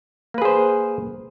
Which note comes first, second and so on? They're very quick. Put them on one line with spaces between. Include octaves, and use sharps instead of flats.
A#3 B4 G#4 C5